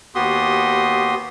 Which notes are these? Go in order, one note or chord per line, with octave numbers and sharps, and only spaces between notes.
D#2 B3 F#4 G4 C6 D#6